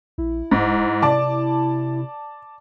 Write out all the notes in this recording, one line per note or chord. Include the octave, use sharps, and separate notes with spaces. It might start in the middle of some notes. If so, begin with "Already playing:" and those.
A#1 E4
D1 G#2
C3 D5 A5 D6